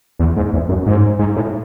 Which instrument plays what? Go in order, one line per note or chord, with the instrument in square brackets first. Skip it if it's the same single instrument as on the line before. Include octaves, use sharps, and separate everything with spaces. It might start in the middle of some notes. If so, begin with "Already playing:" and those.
[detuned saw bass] E2
G#2
E2
F#2
G#2
G#2
A2